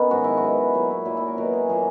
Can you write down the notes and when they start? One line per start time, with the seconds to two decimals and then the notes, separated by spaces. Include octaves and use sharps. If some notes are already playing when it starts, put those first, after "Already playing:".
Already playing: D#3 B3 C#4
0.11 G#2 F#3 F#4
0.24 E4
0.37 F#4
0.42 B2 F#3
0.74 A#2 F#3 E4
0.91 E4
1.05 A#2 F#3 E4
1.17 E4
1.27 A#4
1.38 B2 F#3 A#4
1.53 G#4
1.69 A#2 F#3 G#4